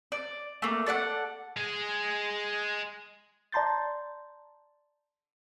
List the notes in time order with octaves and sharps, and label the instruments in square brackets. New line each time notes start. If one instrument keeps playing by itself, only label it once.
[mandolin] D5
A3 A#3
A4 D5 E5 F#5
[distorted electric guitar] G#3 G#4
[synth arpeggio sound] D5 A5 A#5 C6 G6 A6